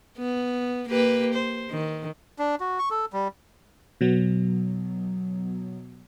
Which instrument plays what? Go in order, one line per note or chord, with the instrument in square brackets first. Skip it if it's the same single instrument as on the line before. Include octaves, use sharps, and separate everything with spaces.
[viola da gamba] B3
A#3 G4 B4
C5
D#3
[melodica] D4
F#4
C#6
A4
G3
[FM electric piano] B2 F#3 B3